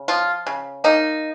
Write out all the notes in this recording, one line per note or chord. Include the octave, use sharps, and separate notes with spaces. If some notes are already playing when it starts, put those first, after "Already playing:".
Already playing: C#3
F3 F4
C#3
A#3 D#4